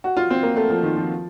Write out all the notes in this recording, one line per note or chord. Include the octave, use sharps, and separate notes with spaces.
F#4
F4
C4
A#3
A3
F3
D#3
F3